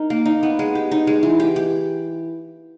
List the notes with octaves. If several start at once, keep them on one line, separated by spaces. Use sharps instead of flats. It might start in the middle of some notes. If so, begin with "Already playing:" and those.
Already playing: D#4 A#4
A#3
D#4
B3
G#3
G4
D#4
G#3
E3
G4
G4